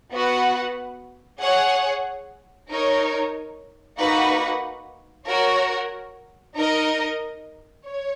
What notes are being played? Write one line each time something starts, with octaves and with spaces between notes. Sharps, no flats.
B3 F#4 B4 F#5
G#4 C#5 F#5
D#4 A#4 C#5
A#3 D#4 F#4 B4 F#5
F#4 A#4 C#5
D#4 A#4 D#5
C#5